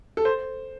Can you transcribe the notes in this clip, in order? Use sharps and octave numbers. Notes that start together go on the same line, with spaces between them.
A4
C5